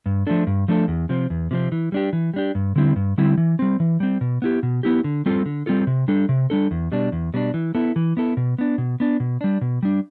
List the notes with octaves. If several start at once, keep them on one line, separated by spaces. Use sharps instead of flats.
G2
F3 A3 D4 A4
G2
F3 A3 D4 A4
E2
C3 F3 C4
E2
C3 F3 C4
E3
G3 D4 G4
E3
G3 D4 G4
G2
D3 G3 C4 E4
G2
D3 G3 C4 E4
E3
G3 C4
E3
G3 C4
B2
B3 E4 G4
B2
B3 E4 G4
D3
G3 C4 F4 A4
D3
G3 C4 F4 A4
C3
G3 D4 A4
C3
G3 D4 A4
E2
B2 G3 D4
E2
B2 G3 D4
E3
B3 E4 A4
E3
B3 E4 A4
B2
B3 D4
B2
B3 D4
B2
G3 D4
B2
G3 D4